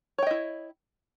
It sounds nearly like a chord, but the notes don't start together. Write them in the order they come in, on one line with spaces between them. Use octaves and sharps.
C#5 G5 D#5 E4